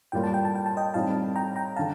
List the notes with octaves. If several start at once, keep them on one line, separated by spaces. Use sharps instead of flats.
A2 G3 A#3 F4 G5
A5
G5
A5
G5
A5
D#5 G5
A2 G3 C4 D#4 F5 A5
G5 A#5
G5 A#5
D3 F5 A5